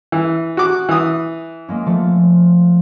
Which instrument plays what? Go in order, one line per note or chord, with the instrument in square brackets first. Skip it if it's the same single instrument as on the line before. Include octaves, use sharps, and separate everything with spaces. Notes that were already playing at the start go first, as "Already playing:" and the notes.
[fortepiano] E3
F#4 D6
E3 D#6
[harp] G#3 A#3 C#4
F3 A3 A4